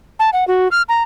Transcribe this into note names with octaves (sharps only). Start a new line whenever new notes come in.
A5
F#5
F#4
F6
A#5